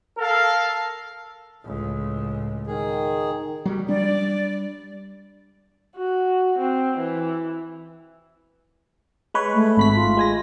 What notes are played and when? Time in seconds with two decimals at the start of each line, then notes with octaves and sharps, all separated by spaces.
0.17 A4 A#4 F5
1.65 C#2 A2
2.67 D#3 G#4
3.65 F#3 G3
3.89 G3 D4 D5
5.97 F#4
6.58 C4
6.97 E3
9.34 G#3 B4 C#5
9.54 A3
9.77 G#1 B5 B6
9.94 F4
10.17 G#3 G#5 A#6